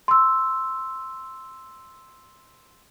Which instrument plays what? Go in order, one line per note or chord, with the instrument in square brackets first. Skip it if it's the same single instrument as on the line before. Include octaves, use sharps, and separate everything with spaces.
[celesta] C6 E6